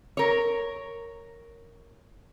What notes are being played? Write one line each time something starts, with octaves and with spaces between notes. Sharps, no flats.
A#4 C#5